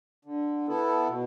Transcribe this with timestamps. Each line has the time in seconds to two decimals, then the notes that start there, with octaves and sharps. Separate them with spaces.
0.25 D3
0.66 B3 E4 A4
1.08 B2